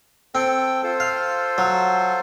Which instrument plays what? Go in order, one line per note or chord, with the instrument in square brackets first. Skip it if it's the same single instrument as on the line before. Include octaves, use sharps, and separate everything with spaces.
[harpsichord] C4 [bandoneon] A4 G5
[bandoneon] F4 A4 C5
[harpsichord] F5
F#3